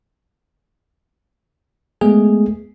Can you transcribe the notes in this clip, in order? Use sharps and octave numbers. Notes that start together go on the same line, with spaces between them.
G#3 A3 B3 G#4